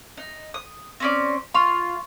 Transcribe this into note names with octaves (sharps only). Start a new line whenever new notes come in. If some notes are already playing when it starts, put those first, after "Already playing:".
D#4
D#6
C4 C#4 D5
F4 C6 C#6 F7